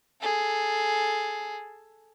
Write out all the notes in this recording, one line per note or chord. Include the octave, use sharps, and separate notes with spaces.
G#4 A4